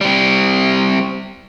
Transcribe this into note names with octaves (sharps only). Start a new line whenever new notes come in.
G3 C4